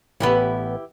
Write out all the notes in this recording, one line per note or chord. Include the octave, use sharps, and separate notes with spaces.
A1 B3 E4 G4 B4